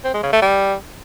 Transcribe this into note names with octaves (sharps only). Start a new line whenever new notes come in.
C4
G#3
C#3
A3
G3